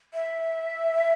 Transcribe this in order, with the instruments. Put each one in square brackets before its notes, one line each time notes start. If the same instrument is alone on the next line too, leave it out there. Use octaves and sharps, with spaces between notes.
[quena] E5